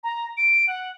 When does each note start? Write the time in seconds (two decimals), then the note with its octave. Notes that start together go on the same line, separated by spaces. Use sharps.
0.03 A#5
0.37 D7
0.67 F#5